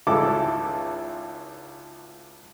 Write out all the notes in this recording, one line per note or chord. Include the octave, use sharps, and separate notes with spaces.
G#1 C#2 E4 A4 D6